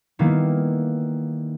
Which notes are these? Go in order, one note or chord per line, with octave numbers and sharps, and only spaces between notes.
D#3 G3 A#3 B3 E4